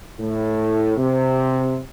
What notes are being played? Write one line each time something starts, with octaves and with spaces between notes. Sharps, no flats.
A2
C3